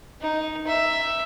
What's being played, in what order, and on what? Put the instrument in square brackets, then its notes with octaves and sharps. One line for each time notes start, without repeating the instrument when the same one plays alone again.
[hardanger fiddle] D#4
E5